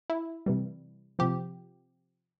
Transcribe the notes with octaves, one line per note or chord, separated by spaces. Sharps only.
E4
C3 E3 G3
C3 F3 G4